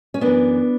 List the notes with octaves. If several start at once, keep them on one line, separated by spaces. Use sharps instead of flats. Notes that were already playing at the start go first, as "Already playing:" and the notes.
C#4
F#2 E3 B3 D4